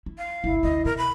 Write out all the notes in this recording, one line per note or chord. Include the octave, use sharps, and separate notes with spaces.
E4
F5
G1 C2 E4
D2 D3 D#5
B2 A#4
B5